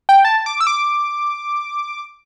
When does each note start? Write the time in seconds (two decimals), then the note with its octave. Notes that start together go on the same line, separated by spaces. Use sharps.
0.09 G5
0.25 A5
0.46 D6
0.61 E6
0.67 D6